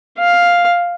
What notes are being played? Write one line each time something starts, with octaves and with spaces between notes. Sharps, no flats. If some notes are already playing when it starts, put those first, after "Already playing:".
F5